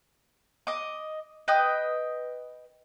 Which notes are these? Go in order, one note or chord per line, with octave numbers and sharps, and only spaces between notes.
D#5 D6
B4 D#5 G5 D#6